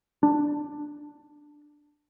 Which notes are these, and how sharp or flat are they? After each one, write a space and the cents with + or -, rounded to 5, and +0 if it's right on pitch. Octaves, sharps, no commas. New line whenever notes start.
D4 +10